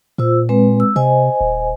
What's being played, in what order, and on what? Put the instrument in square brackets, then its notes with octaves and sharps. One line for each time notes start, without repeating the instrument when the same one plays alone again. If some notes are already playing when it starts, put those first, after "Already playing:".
[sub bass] A#2 [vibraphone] F4 C5 E6
[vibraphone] G#3 C4 B4
E6
[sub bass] C3 [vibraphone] C5 D#5 G#5
[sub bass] D#1